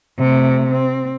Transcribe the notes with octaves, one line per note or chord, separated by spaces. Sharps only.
C3 A3
C4